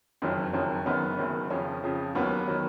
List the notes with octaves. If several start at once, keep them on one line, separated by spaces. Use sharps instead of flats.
F#1 F2 D#3 F#3
F#1 F2 D#3 F#3
F#1 F#2 D#3 F#3 B3
F#1 F#2 D#3 F#3
F2 C#3 F3 C#4
F2 C#3 F3
D#2 D#3 F#3 B3
D#3 F#3